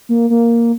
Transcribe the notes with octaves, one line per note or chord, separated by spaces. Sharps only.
A#3
A#3